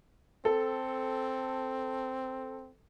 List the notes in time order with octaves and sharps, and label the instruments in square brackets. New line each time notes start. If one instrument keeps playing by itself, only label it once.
[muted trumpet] C4 [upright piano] A4